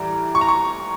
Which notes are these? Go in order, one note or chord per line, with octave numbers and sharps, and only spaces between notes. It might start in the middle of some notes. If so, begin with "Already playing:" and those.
Already playing: A2 E3 G3 A#5
C#6
A#5
C#6